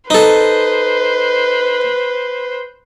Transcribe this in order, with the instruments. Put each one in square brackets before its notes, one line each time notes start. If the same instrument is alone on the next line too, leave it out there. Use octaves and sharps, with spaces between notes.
[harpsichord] D#4 A4 [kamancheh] B4 C5